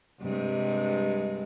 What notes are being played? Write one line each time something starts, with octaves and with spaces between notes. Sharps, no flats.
G2 C3 G#3